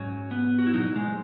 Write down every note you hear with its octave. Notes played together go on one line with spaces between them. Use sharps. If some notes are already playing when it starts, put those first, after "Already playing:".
Already playing: G#2 F#3 C#4
B3
F#4
E4
A#2 F#3 D#4
G#3